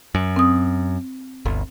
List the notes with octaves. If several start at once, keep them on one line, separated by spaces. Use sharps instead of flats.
F#2
C4 D#6
G1 D2